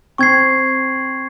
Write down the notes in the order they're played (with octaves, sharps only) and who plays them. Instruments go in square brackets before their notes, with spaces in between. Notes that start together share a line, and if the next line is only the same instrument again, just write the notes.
[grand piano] C4 [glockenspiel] C#6 G#6 C7